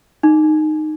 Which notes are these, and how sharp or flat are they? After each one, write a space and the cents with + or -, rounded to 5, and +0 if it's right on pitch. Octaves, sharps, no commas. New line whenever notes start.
D#4 -15